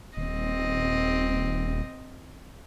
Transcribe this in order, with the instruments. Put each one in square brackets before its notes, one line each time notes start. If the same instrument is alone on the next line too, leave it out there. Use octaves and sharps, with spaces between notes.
[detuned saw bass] D#1 [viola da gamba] C4 D#5